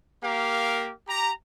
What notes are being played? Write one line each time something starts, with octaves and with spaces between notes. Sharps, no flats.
A#3 G4 A#4 F5
G4 A#5